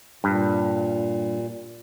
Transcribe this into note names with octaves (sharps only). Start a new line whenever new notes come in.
G2 A#2